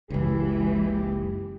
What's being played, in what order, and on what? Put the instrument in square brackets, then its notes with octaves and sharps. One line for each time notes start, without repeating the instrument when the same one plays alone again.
[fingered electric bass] F#1 C#2 [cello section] E3 G#3 [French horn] G4